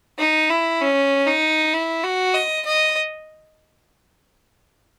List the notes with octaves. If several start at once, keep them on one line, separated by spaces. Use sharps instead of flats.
D#4
E4
C#4
D#4
E4
F#4
D#5
D#5